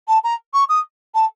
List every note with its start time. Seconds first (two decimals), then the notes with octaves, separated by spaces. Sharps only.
0.08 A5
0.24 A#5
0.54 C#6
0.69 D#6
1.14 A5